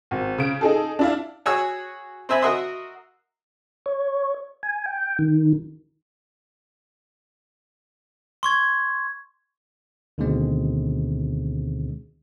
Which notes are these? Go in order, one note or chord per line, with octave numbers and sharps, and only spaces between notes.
G#1
C#3 D7
D#4 G#4 A4
D4 E4 F5
F#4 G#4 C#5 F#5 G#5 E6
C4 C5 E5 G#5 B5
F#4 A#4 D#5 E5 C6 D#6
C#5
G#5
G5
D#3
C6 C#6 G#6
D2 B2 D3 D#3 G#3 C4